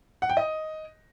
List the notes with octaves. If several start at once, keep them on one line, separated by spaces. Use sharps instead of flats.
F#5
G5
D#5